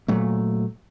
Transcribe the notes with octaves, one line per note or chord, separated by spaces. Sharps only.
A#2 F#3 A3